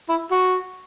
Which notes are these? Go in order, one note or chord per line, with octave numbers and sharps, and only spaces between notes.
E4
F#4